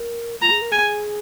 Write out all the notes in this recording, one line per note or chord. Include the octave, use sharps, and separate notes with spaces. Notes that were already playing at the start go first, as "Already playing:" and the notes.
Already playing: A#4
F4 A#5
G#4
A#4
G#4 G#5